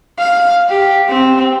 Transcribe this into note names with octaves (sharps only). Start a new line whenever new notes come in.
F5
G4
C4